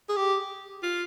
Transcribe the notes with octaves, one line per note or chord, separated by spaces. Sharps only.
G#4
G4
F4